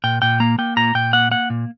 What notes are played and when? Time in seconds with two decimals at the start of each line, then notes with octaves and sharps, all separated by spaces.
0.04 A#2 G5
0.22 A#2 G5
0.40 A#3 A#5
0.58 A#3 G5
0.77 A#2 A#5
0.95 A#2 G5
1.13 A#3 F#5
1.31 A#3 F#5
1.50 A#2